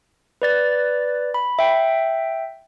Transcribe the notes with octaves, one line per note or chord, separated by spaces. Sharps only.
B4 D5 A6
B5
E5 G5